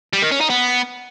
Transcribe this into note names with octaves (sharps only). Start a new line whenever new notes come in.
G3
D#3
C#4
D#4
B3